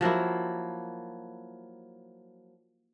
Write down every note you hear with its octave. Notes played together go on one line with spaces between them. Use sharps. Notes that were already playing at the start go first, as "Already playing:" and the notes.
F3 F#3 A#3 E4